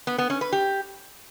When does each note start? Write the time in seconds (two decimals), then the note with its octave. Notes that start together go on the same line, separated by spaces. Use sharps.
0.07 B3
0.18 B3
0.30 C#4
0.41 B4
0.52 G4